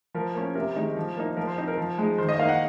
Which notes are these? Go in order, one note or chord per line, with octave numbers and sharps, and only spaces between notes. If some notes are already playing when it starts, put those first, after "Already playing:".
F3 A#4
A#3 C#4
C3 A#4
D#3 G#3 D#4
F3
A#3 D#4
F3 A#4
C5
C4 D#4
A#4
F3
G#3 D#4
D#3 C5
D#5
A#3 D#4 F5
F#5